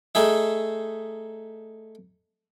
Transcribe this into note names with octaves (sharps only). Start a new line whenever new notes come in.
A3 D#4 G#4 E5